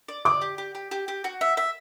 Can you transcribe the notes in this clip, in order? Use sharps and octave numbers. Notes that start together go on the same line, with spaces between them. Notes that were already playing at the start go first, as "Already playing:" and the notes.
D5
D5 D6
G4
G4
G4
G4
G4
F#4
E5
E5